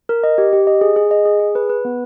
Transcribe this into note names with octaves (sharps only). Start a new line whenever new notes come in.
A#4
D#5
G4
G4
D#5
G#4
G#4
D#5
G#4
G#4
B4
B4
B3